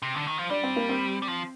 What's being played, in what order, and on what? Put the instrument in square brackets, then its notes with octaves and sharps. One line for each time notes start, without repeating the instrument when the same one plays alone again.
[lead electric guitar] C3
D3
D#3
F3
[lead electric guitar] G3 [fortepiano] D4
[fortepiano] C4
A#3
C4
[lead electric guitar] G3
F3